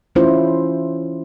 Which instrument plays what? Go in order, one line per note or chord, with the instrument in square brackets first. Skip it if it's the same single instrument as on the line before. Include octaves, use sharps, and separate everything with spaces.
[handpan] E3 A3 C#4 E4 F4 C5